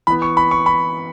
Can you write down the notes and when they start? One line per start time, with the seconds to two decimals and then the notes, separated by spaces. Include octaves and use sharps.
0.07 E3 B3 B5
0.22 C#6
0.37 B5
0.51 C#6
0.66 B5